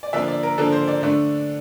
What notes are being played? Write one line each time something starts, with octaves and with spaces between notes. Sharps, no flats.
D5
D3 F3 A#3 D4 E5
D5
A#4
D3 F3 A#3 D4 A4
C5
D5
D3 A3 D4